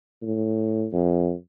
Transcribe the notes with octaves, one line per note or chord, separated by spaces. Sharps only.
A2
F2